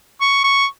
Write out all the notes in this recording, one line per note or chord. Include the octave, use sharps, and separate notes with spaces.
C#6
C#6